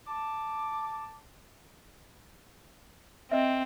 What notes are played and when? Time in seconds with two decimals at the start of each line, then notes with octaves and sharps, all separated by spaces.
0.08 A5 D6
3.31 C4 D#5 E5